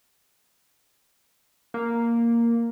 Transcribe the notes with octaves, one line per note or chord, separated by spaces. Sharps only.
A#3